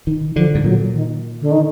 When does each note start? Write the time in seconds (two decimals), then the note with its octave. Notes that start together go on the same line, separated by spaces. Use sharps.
0.07 D#3
0.36 D3 F3
0.55 G#2
0.64 A#2 F#3
0.93 D#3
1.41 D3
1.51 D#3